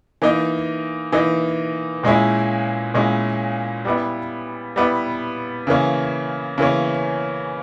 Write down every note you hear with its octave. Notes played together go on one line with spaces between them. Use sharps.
E3 A#3 D#4
E3 A#3 D#4
A#2 G#3 C#4 E4
A#2 G#3 C#4 E4
G3 B3 E4
G3 B3 E4
C#3 E3 A#3 C#4
C#3 E3 A#3 C#4